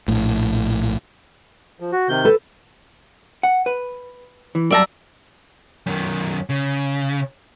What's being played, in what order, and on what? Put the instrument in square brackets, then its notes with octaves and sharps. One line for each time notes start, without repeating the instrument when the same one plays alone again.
[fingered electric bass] A#1 A2
[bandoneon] F3
F#4
C3 D#3 G6
[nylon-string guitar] A4 B4
[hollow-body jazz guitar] F#5
B4
E3
[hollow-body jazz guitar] F#2 G3 A5 [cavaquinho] D5 E5 A#5
[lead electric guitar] F#2 D#3
C#3